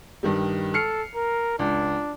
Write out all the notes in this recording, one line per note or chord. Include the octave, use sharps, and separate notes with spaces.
G2 D#3 G3
A4 F6 C7 C#7
A#4
C#2 D4